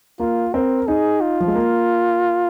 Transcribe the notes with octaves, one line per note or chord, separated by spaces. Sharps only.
A#3 F4
C4 A#4
D#4 G#4
F4
F3
G#3
A#3